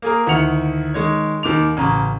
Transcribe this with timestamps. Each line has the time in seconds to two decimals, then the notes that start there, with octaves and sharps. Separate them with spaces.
0.02 A#3 G#4 A#4
0.27 D2 D#3 E4 F#5 C#7 F7
0.94 D#3 G#3 C#5
1.43 D#2 D#3 D6 F7
1.77 A1 C#3 A#5